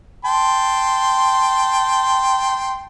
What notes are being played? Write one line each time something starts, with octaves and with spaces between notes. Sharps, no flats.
G5 A5 C6